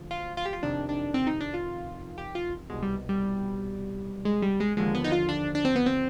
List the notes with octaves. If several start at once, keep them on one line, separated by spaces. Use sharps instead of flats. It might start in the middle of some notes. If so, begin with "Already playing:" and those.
Already playing: D2 F3
F4
F4
G4
F4
F2 C3 D#3 D4
D4
C4
D#4
D4
F4
G4
F4
C2 B2 G#3
G3
G3
G#3
G3
G#3
D#2 D3 F3 G#3
B3
D#4
F4
D4
D4
C4
B3
C4